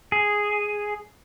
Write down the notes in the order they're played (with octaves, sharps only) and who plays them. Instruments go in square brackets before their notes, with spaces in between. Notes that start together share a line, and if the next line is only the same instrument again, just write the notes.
[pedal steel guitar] G#4